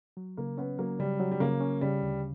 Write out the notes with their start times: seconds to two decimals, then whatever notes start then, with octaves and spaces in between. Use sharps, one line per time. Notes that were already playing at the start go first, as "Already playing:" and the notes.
0.17 F#3
0.37 C#3 A#3
0.58 B3 C#4
0.79 F#3 A#3
0.99 C#3 G3
1.20 F#3
1.31 G3
1.40 C#3 A#3
1.61 C#4
1.81 C#3 G3
2.02 D2